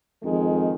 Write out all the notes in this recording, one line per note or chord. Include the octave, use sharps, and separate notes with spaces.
F2 D#3 G#3